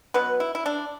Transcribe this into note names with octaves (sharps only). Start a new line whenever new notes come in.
B2 F#3 B3 B4
E4
E4
D4